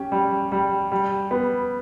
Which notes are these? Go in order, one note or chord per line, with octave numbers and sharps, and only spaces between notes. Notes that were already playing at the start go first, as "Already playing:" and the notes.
Already playing: C#4 G4
G3
G3
G3
B3